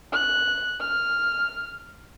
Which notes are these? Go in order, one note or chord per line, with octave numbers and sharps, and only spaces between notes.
F#6
F6